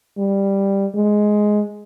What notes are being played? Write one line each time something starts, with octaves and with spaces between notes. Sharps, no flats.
G3
G#3